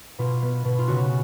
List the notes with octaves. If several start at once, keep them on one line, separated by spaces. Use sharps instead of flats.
B2 F4
B3
B2
F4
C#3 F#4